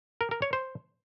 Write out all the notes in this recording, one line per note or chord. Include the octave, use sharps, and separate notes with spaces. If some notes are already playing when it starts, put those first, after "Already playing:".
A#4
A#4
C#5
C5